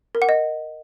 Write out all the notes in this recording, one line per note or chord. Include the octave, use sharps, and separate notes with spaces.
A#4
F#5
D#5